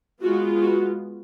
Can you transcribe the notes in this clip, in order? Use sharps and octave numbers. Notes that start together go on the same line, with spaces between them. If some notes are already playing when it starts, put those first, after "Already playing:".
G#3 B3 F4 F#4
F#4